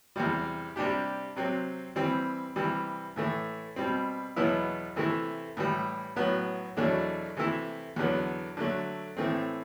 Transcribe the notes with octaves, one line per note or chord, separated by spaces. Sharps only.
E2 C3 G3
C3 G3 D4 G4
C3 F#3 C4
E3 G3 C4
C3 E3 G3
A2 E3 A3
B2 G3 C4
E2 B2 F#3 B3 E4
C3 E3 A3 E4
A2 E3 G3
A2 F#3 B3 F#4
E2 B2 F#3 A3 D4
C3 E3 A3 E4
E2 D3 F#3 B3
D3 F#3 A3
A2 E3 A3 C4